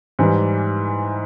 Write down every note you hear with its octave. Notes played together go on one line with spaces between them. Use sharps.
G#2 E3 G3